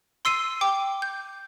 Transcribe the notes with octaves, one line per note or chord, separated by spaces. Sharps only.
C6 E6 C7 D#7
G5 D6
G6